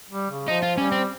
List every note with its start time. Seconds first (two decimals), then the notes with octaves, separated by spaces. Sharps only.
0.11 G3
0.30 C#3
0.48 F3 D#4
0.62 F4
0.77 G3 C#4
0.92 C4